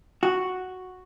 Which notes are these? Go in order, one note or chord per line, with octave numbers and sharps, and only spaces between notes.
F#4